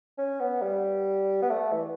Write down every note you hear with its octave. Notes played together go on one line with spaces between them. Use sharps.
C#4
B3
G3
B3
A3
E3